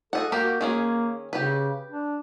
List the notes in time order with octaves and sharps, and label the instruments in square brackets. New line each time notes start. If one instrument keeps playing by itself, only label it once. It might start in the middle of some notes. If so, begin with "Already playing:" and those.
[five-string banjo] G#4 D#5 F#5 [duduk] A4
[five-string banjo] A#3 G4 A#4 [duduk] F#4
[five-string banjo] D#3 C#4 G#4 [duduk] A#3
[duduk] C#3 [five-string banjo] G4 B4
[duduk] D4